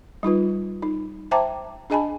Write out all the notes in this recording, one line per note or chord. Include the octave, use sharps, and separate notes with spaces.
G3 D#4 F4 B4
D#4
C5 E5 G5 A5 A#5 D6
D4 G#4 D#5 G#5 A5 B5